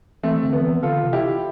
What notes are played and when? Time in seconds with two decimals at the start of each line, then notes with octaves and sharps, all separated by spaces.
0.23 E3 A3 C4
0.43 D3
0.53 B3
0.58 F3
0.63 E3
0.83 D3 F4 A4
1.04 C3
1.13 E4 G4